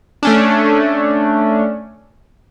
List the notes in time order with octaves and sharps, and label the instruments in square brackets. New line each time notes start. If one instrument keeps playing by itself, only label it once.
[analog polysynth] A3 C#4 D4